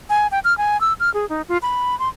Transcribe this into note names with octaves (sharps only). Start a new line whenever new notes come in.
G#5
G5
F6
G#5
E6
F6
G#4
D#4
F4
B5
C6